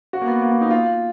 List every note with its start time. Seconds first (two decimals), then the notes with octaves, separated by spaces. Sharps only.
0.13 F#4
0.22 A#3
0.27 B3
0.42 A#3
0.51 B3
0.61 D#4
0.71 F4